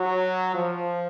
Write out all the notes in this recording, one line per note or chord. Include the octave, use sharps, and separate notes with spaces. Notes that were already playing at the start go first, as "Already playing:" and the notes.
Already playing: F#3
F3